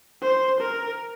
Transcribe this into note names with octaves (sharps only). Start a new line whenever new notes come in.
C5
A#4